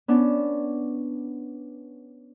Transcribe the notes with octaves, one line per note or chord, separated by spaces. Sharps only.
B3 C#4 D4